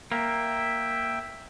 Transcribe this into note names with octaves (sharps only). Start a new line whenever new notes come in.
A#3 E5 G5